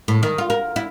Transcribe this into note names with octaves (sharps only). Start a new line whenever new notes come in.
A2
D#3
F4
A#4
E4